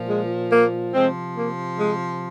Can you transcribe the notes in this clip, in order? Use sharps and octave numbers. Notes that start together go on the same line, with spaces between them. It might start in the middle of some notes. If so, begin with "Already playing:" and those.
Already playing: A#2 F3
G#3
A#3
C3 F3 G#3 C4
A#3
G#3